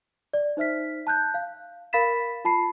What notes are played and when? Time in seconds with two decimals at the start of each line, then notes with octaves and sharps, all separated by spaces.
0.33 D5
0.57 D#4 C5 E5 F6 B6
1.07 A5 F#6 G6
1.34 F5
1.93 A#4 F5 B5 A6 B6 E7
2.45 F4 A5 B5 C7